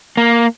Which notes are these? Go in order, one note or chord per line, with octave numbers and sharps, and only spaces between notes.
A#3